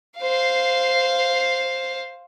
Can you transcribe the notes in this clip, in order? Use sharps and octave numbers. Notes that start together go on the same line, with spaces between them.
C5 F5